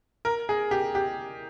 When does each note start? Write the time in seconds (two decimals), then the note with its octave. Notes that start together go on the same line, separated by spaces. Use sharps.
0.25 A#4
0.49 G#4
0.71 G4
0.95 G4